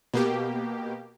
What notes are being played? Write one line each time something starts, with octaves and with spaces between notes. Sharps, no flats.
B2 A#3 G4